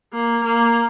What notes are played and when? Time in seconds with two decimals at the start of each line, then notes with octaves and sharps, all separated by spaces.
0.13 A#3
0.44 A#3